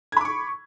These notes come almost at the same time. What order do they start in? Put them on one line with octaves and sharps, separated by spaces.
G#6 B5 D6 C#6